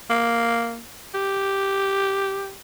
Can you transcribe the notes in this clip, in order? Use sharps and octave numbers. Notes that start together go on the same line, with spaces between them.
A#3
G4